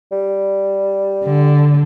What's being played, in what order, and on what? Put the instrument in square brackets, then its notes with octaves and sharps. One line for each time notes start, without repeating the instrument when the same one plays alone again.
[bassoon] G3
[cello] D3